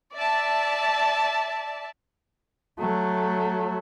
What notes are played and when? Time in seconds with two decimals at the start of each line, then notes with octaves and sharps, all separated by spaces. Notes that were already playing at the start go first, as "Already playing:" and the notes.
0.15 D5 E5 A5
2.79 F#3 A3